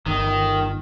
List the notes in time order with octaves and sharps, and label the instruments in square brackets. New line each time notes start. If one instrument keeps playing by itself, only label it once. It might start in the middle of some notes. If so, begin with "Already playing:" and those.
[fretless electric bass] G1 [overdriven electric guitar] D#3